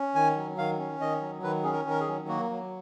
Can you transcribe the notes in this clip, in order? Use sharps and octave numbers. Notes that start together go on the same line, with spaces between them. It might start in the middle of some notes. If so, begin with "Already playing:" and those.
Already playing: C#4
D#3 G#5
F#3
D#3 F5
C#4
D#3 D#5
F#3
D#3 B4
C#4 G#4
A#4
D#3 A#4
G#4
F#3
A#3 F#4
F#3